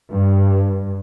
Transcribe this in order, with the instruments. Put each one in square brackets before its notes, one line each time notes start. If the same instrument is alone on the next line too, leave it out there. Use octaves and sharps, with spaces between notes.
[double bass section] G2